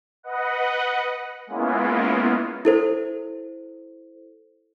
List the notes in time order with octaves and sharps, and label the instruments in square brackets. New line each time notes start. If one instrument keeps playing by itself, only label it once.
[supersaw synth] B4 D#5 F#5
G#3 A#3 B3 C#4 E4 F4
[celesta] E4 A4 C5